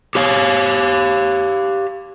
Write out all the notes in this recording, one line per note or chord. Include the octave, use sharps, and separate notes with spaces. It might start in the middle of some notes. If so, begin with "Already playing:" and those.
G4 C#5 F5